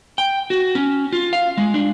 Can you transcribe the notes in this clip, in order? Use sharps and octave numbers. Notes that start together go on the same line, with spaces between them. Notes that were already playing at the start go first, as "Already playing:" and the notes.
G5
F#4
C#4
F4
F5
G#3
D4